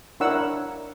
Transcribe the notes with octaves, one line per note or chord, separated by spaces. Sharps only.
D4 E4 A#4 C#5 F#5 E6